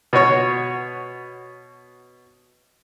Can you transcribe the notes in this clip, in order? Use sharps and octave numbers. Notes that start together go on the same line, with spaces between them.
B2 F#4 C#5 C#6